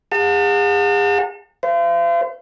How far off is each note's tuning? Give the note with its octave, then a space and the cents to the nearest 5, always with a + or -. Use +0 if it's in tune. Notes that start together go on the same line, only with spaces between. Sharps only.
G#4 -35 F#5 -35 A5 +40
C5 -35 F5 -40